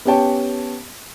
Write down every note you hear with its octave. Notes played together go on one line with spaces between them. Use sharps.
B3 C#4 G4 C#5 G5 A5